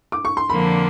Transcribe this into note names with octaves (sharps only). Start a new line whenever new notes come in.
D6
C#6
C6
F2 D3 F3 A#3 D4 B5